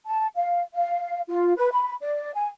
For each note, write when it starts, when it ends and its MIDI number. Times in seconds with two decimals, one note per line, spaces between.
0.07 0.27 81
0.37 0.60 77
0.74 1.21 77
1.28 1.54 65
1.56 1.69 71
1.72 1.95 83
2.01 2.31 74
2.34 2.47 80